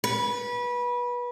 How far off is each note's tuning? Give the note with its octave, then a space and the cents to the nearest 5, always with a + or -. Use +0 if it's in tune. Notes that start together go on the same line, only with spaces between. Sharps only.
B4 -25